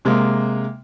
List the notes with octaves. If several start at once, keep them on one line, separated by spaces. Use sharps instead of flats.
C3 G#3 A#3